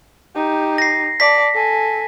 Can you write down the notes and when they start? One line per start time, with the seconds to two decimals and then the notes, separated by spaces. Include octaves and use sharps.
0.35 D#4 G4
0.78 A#6 C7
1.20 D5 A5 B6
1.55 A4 G#5